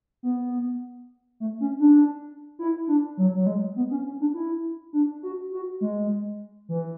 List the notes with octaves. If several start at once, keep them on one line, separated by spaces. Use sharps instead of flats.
B3
A3
C#4
D4
E4
D4
F#3
F#3
G#3
B3
C#4
C#4
D4
E4
D4
F#4
F#4
G#3
E3